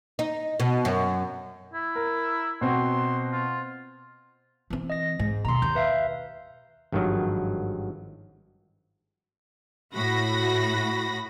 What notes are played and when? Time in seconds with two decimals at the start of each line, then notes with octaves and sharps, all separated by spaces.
0.19 D#4
0.60 B2
0.85 F#2
1.74 E4
1.95 A#4
2.61 B2 C4 F#4 C6
3.32 F4
4.70 E3 C4
4.90 D#5 A#6
5.19 G#2
5.45 D#2 B2 A#5 C6
5.62 D#2 G6
5.75 B4 E5 F5
6.92 G#1 G2 D#3 F3 F#3
9.94 A2 F#4 B5 A#6